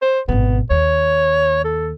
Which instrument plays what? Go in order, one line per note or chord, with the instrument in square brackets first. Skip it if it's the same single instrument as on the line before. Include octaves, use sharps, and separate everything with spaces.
[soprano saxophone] C5
[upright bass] G#1 B2 [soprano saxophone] B3
[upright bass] D#2 [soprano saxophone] C#5
[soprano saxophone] A4